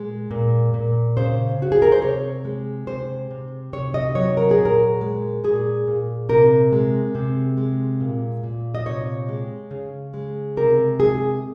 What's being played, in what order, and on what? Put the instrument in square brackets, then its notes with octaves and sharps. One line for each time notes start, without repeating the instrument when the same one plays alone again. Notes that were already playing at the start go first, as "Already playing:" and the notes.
Already playing: [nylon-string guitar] A#2 G#3
A#2
A#2
C#3 C5
C#3 F#4
G#4
A#4
C5
C3 C#5
G#3
C3 C5
C3
C3 C#5
D#5
F#3 C#5
A#4
G#4
A#2
A#4
G#3
A#2 G#4
A#2
C3 A#4
G#3
C3
G#3
A#2
A#2
D#5
C3 C#5
G#3
C#3
G#3
C3 A#4
G#3 G#4